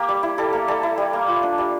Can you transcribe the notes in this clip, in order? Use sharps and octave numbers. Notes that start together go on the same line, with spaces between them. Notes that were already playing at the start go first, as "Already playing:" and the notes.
Already playing: A#3 G4
G3
E4
G3 A4
A#3 A#4
G3 A4
E4
G3
A#3
F4
D4
G3